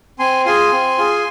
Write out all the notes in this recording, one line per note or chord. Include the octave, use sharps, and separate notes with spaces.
C4 G#5 C6
F4 G#4 G#5 C6
C4
F4 G#4